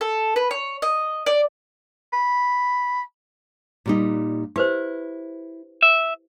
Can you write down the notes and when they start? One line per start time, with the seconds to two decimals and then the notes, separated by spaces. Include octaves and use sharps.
0.01 A4
0.36 B4
0.51 C#5
0.82 D#5
1.26 D5
2.13 B5
3.86 A#2 G3 D#4
4.56 E4 G4 B4 C5
5.82 E5